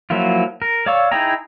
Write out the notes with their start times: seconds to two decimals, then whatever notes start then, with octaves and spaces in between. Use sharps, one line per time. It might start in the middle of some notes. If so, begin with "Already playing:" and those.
0.10 F3 F#3 A#3 E4 F4
0.62 A#4
0.86 C#5 D5 F5 C#6 E6
1.12 D#4 E4 G#4 G5 A#5